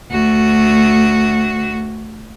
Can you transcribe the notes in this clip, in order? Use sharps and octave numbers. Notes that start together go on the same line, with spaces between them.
D2 F#4